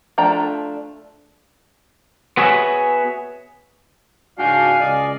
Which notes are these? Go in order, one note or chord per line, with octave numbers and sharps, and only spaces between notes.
F3 A3 D4 G5 A#5
B3 F#4 G#4 C#5 E5
C#2 G#2 D4 F#4 F5 G5 G#5
C#2 D5 D#5